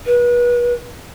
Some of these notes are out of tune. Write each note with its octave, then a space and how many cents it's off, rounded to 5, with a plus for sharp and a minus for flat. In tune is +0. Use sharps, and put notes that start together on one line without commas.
B4 -35